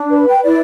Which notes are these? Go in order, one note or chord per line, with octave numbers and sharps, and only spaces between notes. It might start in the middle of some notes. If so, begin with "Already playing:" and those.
Already playing: D4
B4
G5
E4 D5